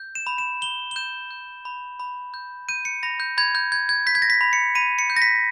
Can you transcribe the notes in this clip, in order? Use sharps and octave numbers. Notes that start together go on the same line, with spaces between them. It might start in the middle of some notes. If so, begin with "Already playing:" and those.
Already playing: G6
E7
B5
E7
B5 G7
G7
G6 E7
G6
B5
B5
G6
G6 D#7
C#7
B5 A#6
G6
B5 G#6
G6
G6 G#6
G#6
G6 B6
G#6
A#6
B6
B5
C#7
B5 D#7
C#7
G6
A#6
B6